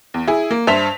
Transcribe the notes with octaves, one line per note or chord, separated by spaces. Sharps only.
E2
E4 G#4
A#3
G2 C5 E5 B6 F7